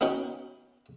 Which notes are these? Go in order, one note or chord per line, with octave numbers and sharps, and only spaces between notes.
B3 C#4 D#4 F#4 G5